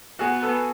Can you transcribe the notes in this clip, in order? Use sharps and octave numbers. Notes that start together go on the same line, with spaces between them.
B3 F#4 G#4
A4 B4